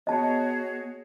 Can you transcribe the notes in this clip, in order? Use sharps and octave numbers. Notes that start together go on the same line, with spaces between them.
B3 F#4 G#4 C#5 D#5 A5